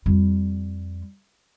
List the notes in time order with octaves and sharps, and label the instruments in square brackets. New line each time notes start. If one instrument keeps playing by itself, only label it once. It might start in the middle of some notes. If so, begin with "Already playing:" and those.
[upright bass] F2 G3